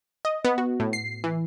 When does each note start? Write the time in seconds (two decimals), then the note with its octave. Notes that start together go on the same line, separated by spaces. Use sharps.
0.25 D#5
0.45 B3
0.58 F#4
0.80 A2
0.93 C7
1.24 E3